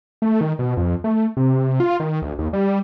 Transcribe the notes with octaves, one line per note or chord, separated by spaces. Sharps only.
A3
D#3
B2
F2
A3
C3
F4
D#3
D2
D#2
G3